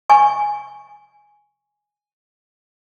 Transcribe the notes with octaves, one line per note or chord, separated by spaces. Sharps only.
G#5 C#6